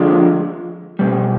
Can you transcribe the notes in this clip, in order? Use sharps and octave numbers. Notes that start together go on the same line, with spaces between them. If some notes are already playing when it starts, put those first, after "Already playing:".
Already playing: D3 F3 G#3
B2 G3